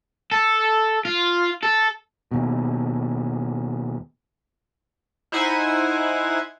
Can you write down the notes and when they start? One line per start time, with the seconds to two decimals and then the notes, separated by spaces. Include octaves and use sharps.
0.31 A4
1.05 F4
1.63 A4
2.31 D#2 B2
5.32 D#4 E4 C5 E5 F#5 G#5